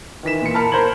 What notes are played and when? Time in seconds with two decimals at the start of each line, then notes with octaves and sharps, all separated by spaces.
0.23 D#3 E3 B6 E7
0.41 A#2 C#7
0.54 A#4 A5 B5 F6
0.72 A#4 C5 A#5 G#6 F#7